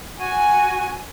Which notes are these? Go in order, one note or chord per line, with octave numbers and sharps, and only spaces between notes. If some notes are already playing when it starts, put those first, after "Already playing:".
F#4 G#5